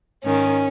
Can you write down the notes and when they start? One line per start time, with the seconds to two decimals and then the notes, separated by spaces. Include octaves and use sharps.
0.23 G#2 D#3 C#4